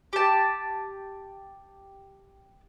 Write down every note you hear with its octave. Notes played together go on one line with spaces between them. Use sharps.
G4 A5